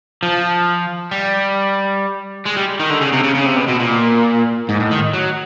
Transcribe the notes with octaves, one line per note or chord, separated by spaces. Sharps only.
F3
G3
G#3
G3
D#3
D3
C#3
C3
C#3
C#3
C3
B2
B2
A#2
G#2
A2
D#3
F#3